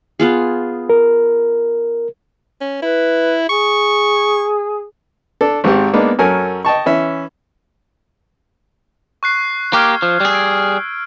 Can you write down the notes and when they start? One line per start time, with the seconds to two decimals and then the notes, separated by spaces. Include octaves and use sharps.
0.20 B3 F4 G#4
0.89 A#4
2.61 C#4
2.82 E4 B4
3.49 G#4 C#6
5.41 D4 A4
5.64 G#1 G#2 C4 G4
5.93 G#3 A#3 B3 D4 D#4
6.19 F#2 C#4 A4 A#4 G#5
6.65 D#5 G5 A5 C#6
6.86 E3 C#4 E5
9.23 C#6 F#6 C7
9.73 A#3 G4 C#6 F6 G#6
10.02 F3
10.20 G3 G#4
10.32 E6 D7